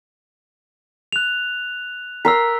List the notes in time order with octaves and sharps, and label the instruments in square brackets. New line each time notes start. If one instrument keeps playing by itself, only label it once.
[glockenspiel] F#6 F7
[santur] A#4 C6 [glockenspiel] E6 B6